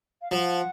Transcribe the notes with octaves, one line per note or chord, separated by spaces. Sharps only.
F5
F3 F#5